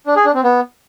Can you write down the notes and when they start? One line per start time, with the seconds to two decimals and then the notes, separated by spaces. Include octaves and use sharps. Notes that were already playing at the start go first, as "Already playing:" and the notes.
0.07 D4
0.16 G#4
0.25 D4
0.35 C4
0.44 B3